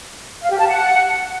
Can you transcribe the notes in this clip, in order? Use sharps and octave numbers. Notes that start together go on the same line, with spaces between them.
F5
G4
A5
F#5